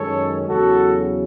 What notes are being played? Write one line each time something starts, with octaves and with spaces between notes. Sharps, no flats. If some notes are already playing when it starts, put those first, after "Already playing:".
Already playing: F#2 D#3 G#3 C#4 A4 C#5
E2 C#3 F#3 F#4 A4